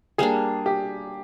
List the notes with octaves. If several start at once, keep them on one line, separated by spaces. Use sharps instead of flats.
G3 A#3 D4 G#4
G4